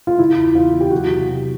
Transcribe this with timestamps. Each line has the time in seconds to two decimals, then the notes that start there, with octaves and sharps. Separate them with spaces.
0.07 F4
0.19 C#3 E4
0.37 E2
0.55 E2 F4
0.73 E2
0.80 G4
0.91 F#3 F#4
1.10 C3
1.29 C3